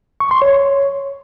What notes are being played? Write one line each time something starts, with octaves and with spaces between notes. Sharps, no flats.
C#6
C6
C#5